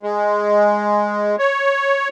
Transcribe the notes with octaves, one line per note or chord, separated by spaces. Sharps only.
G#3
C#5